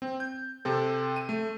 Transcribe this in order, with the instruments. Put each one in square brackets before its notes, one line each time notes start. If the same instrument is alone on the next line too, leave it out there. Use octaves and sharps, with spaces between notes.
[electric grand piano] C4
G6
C3 C4 A4
D#7
A3